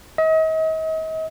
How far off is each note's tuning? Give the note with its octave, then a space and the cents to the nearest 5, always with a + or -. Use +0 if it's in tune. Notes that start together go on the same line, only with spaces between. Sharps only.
D#5 +40